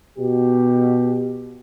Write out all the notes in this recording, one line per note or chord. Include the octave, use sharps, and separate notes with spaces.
B2 G4